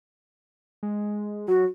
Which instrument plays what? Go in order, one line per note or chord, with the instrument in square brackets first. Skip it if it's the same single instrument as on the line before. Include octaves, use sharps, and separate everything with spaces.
[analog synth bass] G#3
[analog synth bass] F#3 [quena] F#4